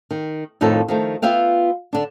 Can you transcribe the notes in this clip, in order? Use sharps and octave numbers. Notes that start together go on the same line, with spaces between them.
D#3
F2 A2 D#3 D#4 F4 A4
D#3 F3 A3
B3 F4 E5 F5 G5
D3 D4